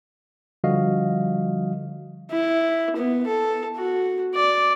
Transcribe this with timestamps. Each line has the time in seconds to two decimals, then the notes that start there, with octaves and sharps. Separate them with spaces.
0.64 D3 F3 G3 F#4 D#5 F5
2.31 E4
2.96 B3
3.27 A4
3.76 F#4
4.35 D5